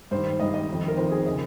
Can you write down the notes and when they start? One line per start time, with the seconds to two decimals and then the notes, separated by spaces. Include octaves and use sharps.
0.11 G2 D#3 C5
0.40 G2 D#3 D#5
0.54 D#5
0.69 F2 D#3
0.88 A#4
0.97 F2 D#3 C5
1.12 G#4
1.26 C#3 D#5